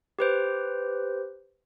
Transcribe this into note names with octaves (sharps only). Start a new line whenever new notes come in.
G4 B4 C5